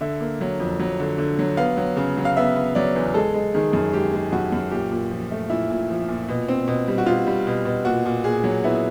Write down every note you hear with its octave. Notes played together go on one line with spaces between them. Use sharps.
D3 E5
A#3
F#3
F2
F#3
D3
D3
F#3
B3 F5
F#3
C#3
F#3
F5
B3 E5
B3
F#3 D5
E2
G#3 A4
G#3
D#3 G#4
F#2
G#3 G4
G#3
F#2 F#4
F#2
A#2 G4
A#2
F3
A3
A#2 E4
A#2
F3
A#2
B2
C4
B2
G3
F#4
B2 F4
G3
B2
B2
A#2 F#4
A#2
A#2 G#4
F#3
B3 E4